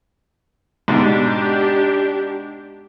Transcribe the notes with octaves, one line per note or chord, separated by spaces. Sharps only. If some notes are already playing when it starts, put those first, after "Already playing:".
G#2 B2 D4 G4